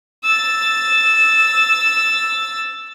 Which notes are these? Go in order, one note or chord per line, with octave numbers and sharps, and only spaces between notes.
E6 A6